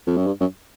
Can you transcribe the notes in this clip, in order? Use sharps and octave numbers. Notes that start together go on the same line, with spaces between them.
F2
F#2
G2
F#2